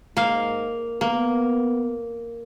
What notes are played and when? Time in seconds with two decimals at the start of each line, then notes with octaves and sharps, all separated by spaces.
0.17 G#2 A#3 F5
1.01 A#3 B3